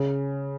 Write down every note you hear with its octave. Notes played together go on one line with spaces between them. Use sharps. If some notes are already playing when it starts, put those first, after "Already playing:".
Already playing: C#3